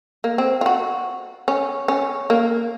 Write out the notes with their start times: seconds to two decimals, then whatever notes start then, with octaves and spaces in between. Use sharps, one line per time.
0.24 A#3
0.38 C4
0.61 F4
0.66 F#4
1.48 C#4
1.88 C#4
2.30 A#3